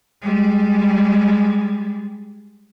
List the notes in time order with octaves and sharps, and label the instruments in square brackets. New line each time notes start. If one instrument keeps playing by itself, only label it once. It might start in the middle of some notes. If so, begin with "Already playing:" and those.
[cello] G3 G#3